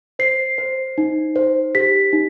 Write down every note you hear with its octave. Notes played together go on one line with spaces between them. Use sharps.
C5 C7
C5
D#4
C5
G4 B6
D#4